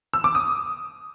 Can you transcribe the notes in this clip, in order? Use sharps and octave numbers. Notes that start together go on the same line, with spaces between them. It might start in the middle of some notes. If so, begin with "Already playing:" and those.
E6
D6
D#6